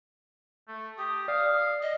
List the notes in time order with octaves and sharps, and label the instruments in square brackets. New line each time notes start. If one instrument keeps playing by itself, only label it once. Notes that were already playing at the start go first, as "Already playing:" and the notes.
[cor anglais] A3
[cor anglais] G4 [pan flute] D#6
[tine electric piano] D5 [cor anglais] F5
[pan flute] D#5